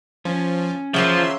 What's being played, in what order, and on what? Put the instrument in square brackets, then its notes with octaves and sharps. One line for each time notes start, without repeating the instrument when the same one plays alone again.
[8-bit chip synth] F3 [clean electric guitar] C#4
[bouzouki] C#3 F#3 A#3 [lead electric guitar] F3 [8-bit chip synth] E5 C6